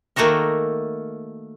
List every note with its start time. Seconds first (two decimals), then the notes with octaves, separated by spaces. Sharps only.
0.16 D#3 A3 A#3 F#4 A4 A#4